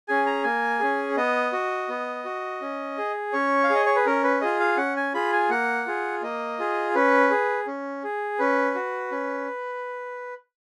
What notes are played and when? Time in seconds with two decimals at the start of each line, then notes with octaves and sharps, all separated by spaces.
0.08 C#4 G#4 G#5
0.26 A#5
0.44 A#3 G#5
0.80 C#4 G#4
1.17 B3 D#5
1.53 F#4
1.89 B3
2.25 F#4
2.61 C#4
2.98 G#4
3.33 C#4 C#5
3.64 F5
3.70 G#4 D#5
3.85 C#5
3.96 B4
4.06 C#4 A#4
4.23 B4
4.41 F4 G#4 D#5
4.60 F5
4.77 C#4 F#5
4.96 G#5
5.14 F4 G#4 B5
5.33 G#5
5.50 A#3 F#5
5.87 F4 G#4
6.22 A#3 D#5
6.59 F4 G#4
6.95 C#4 B4
7.30 G#4
7.67 C#4
8.04 G#4
8.39 C#4 B4
8.75 F#4
9.11 C#4